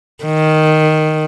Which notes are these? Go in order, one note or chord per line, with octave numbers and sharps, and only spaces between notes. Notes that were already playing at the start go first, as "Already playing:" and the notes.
D#3